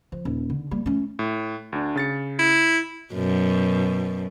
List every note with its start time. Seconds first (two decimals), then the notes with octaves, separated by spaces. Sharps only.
0.12 F3
0.25 D#1
0.50 D3
0.71 G3 A#3
0.86 A3 C#4
1.19 A2
1.72 D2 D4
1.96 C#3 A6 C#7
2.39 E4
3.14 F#2 B2